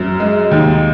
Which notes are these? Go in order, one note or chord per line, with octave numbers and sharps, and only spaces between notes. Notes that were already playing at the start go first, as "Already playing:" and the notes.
Already playing: F#2
G#3
D#2